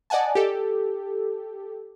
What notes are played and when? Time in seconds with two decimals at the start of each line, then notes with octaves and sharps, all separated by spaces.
0.10 D5 D#5 F#5 G#5 A5
0.35 G4 A4